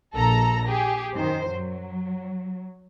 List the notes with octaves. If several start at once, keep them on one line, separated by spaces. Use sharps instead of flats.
A#1 A4 A#5 A#6
G4 G#4
F#2 D#3 C5
F#3